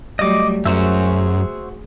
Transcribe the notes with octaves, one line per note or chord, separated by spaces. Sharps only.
F#3 G3 A3 D#5 D6
F#2 F#4 G#4 C5 E5